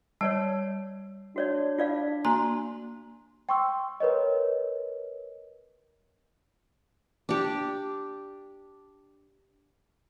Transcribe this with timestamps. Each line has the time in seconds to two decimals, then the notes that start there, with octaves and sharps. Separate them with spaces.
0.21 G3 C#5 D5 A5
1.36 D4 F#4 C#5 D5
1.78 F4 D5 F5
2.25 A#3 F#4 G#5 A#5 C6
3.49 G5 C6 C#6 E6
4.00 A#4 B4 C#5 D#5
7.29 D4 G4